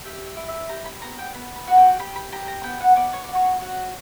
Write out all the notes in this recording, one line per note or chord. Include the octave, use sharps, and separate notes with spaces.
G4 E5
E5
E4
E5
G4 A#5
B5
B3 A#5
G5
B3 B5
B5
F#4
G5
G4 B5
B5
G4 A#5
A#5
B3 G5
F#5
B3 D5
C#5
F#4 D5
C#5
F#4